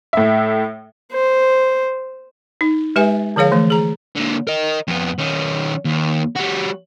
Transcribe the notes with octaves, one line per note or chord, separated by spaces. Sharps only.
A2 E5
C5
D#4
G#3 G4 B4 E5 G#5
D3 F3 G#4 C#5 F5
E3 A3
G#4 A#5
D3 A#3
A#4 D#5
F2 B3
D#3 C#4
D#2
G3 F#4